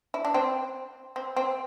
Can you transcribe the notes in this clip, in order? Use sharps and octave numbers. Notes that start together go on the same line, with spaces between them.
E4
D4
C4
C4
C4